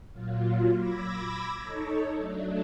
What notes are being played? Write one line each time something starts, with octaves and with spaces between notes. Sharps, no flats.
A#2 F#3 F4
B5 D6 E6 G#6 A#6
D#4 A4 C#5
F#3 A3 D4